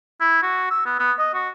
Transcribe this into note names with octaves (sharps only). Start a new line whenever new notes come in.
E4
F#4
E6
B3
B3
D#5
F#4